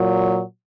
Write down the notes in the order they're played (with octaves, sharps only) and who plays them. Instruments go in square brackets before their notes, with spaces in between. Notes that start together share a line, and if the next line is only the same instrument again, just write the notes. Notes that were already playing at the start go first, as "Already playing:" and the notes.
Already playing: [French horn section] A#2 F#3